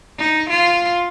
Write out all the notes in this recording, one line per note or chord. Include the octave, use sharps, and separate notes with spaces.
D#4
F4